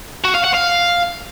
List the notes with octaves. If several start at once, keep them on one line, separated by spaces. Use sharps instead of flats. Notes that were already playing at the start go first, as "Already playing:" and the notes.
F#4
F5
F#5
F5